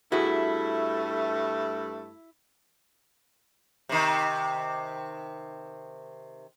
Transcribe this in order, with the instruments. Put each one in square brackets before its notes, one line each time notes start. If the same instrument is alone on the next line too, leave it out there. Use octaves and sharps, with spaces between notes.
[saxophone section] G2 A3 [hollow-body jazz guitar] E4 F#4 G#4
[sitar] C3 D#3